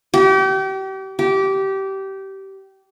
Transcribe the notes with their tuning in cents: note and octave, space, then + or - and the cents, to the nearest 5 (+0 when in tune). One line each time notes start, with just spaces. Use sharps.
G4 -35
G4 -20